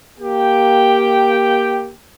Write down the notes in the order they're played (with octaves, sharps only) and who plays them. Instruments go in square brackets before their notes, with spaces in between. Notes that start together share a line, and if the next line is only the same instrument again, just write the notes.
[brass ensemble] A#3 G4 G5